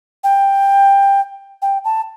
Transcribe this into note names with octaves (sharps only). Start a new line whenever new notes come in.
G5
G5
A5